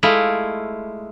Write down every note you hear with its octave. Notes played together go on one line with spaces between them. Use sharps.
G#3 A3 E4 F4